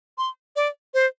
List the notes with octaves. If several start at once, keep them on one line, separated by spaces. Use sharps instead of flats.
C6
D5
C5